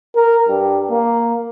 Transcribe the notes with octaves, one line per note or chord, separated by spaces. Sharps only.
A#4
G2
A#3